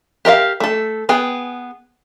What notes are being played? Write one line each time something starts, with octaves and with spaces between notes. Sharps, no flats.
G4 A#4 E5 F5
A3 A4
B3 G#4 G5